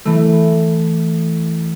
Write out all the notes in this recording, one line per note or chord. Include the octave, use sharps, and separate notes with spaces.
E3 A3